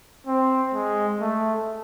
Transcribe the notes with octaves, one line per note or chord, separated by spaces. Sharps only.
C4
G#3
A3